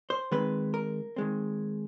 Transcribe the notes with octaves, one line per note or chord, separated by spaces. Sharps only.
C5
D#3 G#3 C4 B4
A#4
D#3 G#3 C4